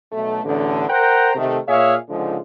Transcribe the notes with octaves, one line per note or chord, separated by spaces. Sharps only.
B1 A3
A1 E2 D3
A#4 C5 F#5 G5 A#5
C3 D#3 A3
A#2 G#4 C#5 E5 F5
C#2 G#2 D3 F3 G#3